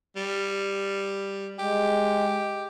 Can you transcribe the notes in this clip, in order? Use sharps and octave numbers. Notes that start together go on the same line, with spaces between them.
G3
G#3 G4